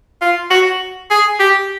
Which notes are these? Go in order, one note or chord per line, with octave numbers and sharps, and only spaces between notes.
F4
F#4
G#4
G4